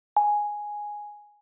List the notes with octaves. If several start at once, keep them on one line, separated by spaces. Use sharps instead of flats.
G#5